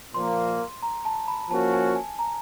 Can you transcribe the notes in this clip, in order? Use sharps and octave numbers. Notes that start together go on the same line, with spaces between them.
A#2 F3 A#3 C6
A#5
A5
B5
F3 A#3 C#4 F#4 A5
G#5
G#5
A#5